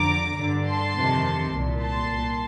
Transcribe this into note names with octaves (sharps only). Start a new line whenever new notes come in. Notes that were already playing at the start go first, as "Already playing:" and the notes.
Already playing: F2 D3 A#5 D6
G2 D3
A5 C6
F2 C3 D#3
C2 A#2
A5 C6
C2 A#2